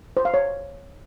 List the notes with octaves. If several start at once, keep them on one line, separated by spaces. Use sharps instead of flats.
C5
F5
C#5